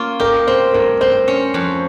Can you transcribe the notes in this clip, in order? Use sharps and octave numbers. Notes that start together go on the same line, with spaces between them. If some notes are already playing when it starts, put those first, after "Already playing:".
Already playing: A#3 C#4 F4
G4 A#4
C4 C5
G2 A#4
C4 C5
C#4
F2